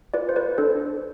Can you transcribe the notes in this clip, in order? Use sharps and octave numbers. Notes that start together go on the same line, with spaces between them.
F4 B4 D5
C5
B4 D5
D4 A4 C5